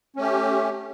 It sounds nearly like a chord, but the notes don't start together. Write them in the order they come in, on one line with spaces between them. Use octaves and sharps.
C#4 A3 G4